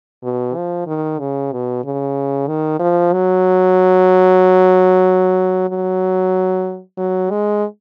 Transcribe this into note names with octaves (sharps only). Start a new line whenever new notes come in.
B2
F3
D#3
C#3
B2
C#3
D#3
F3
F#3
F#3
F#3
G#3